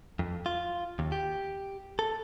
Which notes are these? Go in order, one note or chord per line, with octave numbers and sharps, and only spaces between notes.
F2
F4
D#2
G4
A4